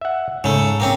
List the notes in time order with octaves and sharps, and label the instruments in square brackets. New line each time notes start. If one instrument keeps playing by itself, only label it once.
[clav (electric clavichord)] E5 F#5
[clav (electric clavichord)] G#2 [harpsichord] C#3 A3
[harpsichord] A#3 C4 C#4